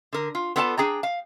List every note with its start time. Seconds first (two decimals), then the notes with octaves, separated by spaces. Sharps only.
0.13 D3 A#4
0.35 F4
0.56 B3 F4 A4 D5 G#5 A5
0.78 D4 G#4 G5 A#5
1.03 F5